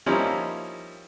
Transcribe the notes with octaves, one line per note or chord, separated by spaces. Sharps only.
F3 G3 A#3 C#4 D#4 E4